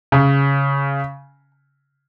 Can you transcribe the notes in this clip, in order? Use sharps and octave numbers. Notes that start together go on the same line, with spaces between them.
C#3